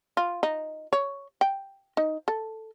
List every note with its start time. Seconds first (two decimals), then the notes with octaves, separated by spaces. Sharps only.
0.17 F4
0.43 D#4
0.93 C#5
1.41 G5
1.97 D#4
2.28 A4